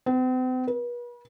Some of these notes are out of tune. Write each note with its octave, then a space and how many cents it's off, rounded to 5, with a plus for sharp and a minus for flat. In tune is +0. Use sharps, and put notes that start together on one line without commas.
C4 -45
B4 -40